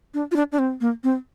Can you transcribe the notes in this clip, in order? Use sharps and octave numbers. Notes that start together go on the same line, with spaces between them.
D4
F4
D4
D4
C4
A#3
C4